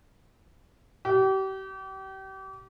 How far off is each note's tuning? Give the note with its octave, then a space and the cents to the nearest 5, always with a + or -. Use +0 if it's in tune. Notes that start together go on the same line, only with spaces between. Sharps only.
G4 -35